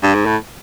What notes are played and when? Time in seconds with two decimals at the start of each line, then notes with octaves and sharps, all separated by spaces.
0.03 G2
0.15 G#2
0.26 A2